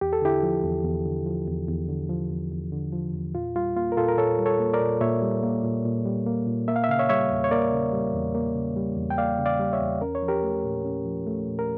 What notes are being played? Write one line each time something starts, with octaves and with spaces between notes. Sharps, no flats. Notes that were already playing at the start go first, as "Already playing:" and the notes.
E2 G4
A4
D3 E4 G4
F3
E2
E2
D3
F3
E2
E2
D3
F3
E2
E2
D3
F3
E2
A#2 F4
G3 F4
A#3 F4
A#4
A#2 F4 A4
A#4
A#2 A4 C#5
G3
A4 C#5
A#3
A#4 D5
A#2
A#2 C#5 E5
G3
A#3
A#2
A#2
G3
A#3
A#2
A#3 E5
F5
E5
C#3 F5
C#5 E5
G3 C#5 E5
E2
C#5
A#3 A#4 D5
C#3
G3
E2
A#3
C#3
G3
E2
G5
A#3 D5 F5
C#3
D5 F5
G3
C#5 E5
E2
C#4 A#4
C#5
F3
G4 A#4
A3
A#2
C#4
F3
A3
A#2
A#4